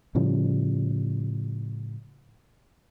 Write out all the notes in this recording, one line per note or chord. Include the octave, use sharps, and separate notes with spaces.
A2 C#3 F3 G3